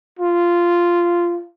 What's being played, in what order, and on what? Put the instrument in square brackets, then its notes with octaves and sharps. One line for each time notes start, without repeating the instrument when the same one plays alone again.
[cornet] F4